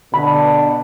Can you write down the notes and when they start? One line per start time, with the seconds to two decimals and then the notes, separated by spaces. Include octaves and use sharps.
0.14 B2 D3 B5